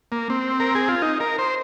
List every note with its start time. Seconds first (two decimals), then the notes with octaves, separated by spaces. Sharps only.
0.12 A#3
0.30 C4
0.60 A#4
0.75 G#4
0.88 F4
1.02 D#4
1.20 A#4
1.38 C5